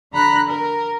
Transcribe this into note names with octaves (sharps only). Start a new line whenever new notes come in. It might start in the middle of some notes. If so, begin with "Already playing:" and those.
D3 A#5 B5 F#6 A#6
A#4